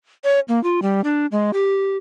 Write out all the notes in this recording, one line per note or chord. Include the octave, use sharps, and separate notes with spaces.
C#5
A#3
F4
G3
D4
G#3
G4